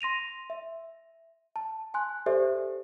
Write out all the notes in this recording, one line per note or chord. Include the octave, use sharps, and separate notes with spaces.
C6 A#6 D#7 F7
E5
A5
G#5 C6 F#6
G4 A4 C5 D5 E5